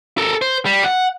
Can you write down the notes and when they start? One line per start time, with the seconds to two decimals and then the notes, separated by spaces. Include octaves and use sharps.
0.18 A4 A#4
0.42 C5
0.66 G3
0.84 F#5